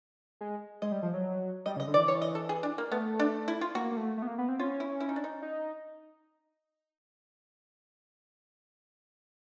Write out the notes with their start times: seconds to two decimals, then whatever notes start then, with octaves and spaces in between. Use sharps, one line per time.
0.41 G#3
0.82 G#3 D#5
0.92 G3
1.03 F3
1.13 F#3
1.66 G3 D#5
1.77 C#3
1.80 D#5
1.87 D3
1.94 D5
1.97 E3
2.08 C#5
2.22 D#5
2.35 A4
2.49 G#4
2.63 D4
2.78 A#3
2.91 A3 B3
3.19 D4
3.48 E4
3.61 F4
3.75 A#3 F#4
3.91 A#3
3.97 A3
4.17 A3
4.22 B3
4.27 A#3
4.38 B3
4.48 C4
4.60 C#4 F4
4.80 E4
5.00 E4
5.09 D#4
5.16 D4
5.24 D#4
5.42 D#4